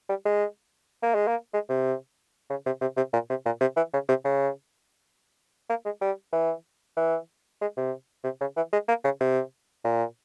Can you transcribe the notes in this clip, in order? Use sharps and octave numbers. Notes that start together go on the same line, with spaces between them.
G3
G#3
A#3
G#3
A#3
G#3
C3
C#3
C3
C3
C3
A#2
C3
A#2
C3
E3
C#3
C3
C#3
A#3
G#3
G3
E3
E3
G#3
C3
C3
C#3
E3
G#3
A#3
C#3
C3
A#2